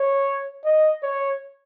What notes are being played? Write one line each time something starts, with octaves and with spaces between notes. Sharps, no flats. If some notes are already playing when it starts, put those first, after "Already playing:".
Already playing: C#5
D#5
C#5